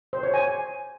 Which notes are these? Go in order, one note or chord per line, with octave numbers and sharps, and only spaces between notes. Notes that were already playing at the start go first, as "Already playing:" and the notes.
C5
C#5
G#5